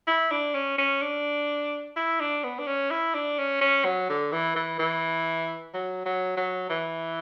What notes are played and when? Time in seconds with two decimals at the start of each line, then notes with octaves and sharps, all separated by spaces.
0.07 E4
0.31 D4
0.54 C#4
0.78 C#4
1.02 D4
1.96 E4
2.20 D4
2.44 B3
2.59 D4
2.67 C#4
2.91 E4
3.14 D4
3.39 C#4
3.61 C#4
3.85 F#3
4.10 D3
4.32 E3
4.56 E3
4.79 E3
5.74 F#3
6.06 F#3
6.37 F#3
6.70 E3